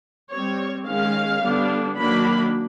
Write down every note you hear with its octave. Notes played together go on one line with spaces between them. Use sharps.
G3 C4 C#5
D#3 G#3 C#4 F5
D3 G3 B3 D4
D#3 F#3 A#3 D4 B5